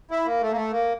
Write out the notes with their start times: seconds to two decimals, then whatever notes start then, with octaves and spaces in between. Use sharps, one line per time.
0.11 E4
0.26 A#3
0.42 A3
0.52 A#3
0.56 A3
0.72 A#3